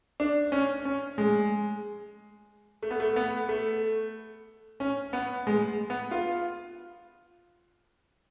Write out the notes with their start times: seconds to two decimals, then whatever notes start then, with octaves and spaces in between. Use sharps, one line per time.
0.20 D4
0.52 C#4
0.85 C#4
1.18 G#3
2.83 A3
2.91 B3
3.00 A3
3.16 B3
3.49 A3
4.80 C#4
5.13 B3
5.47 G#3
5.90 B3
6.11 F4